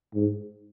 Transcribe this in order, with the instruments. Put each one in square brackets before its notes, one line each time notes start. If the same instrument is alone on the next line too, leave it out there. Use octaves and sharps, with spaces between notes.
[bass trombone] G#2